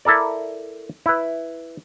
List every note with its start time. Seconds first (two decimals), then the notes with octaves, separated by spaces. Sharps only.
0.05 E4 A4 A#4 D5
1.06 E4 B4